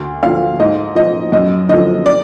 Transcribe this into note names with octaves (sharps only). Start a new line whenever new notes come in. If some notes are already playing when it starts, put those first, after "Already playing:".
Already playing: D2
D3 F3 F5
G#2 D#5
F3 D#5
F#2 D#5
D3 F3 D#5
D5